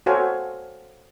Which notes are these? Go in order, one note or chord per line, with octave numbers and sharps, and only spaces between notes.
F#4 A4 C5 C#5 F5 G#5